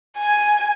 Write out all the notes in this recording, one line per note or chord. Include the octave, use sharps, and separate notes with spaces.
G#5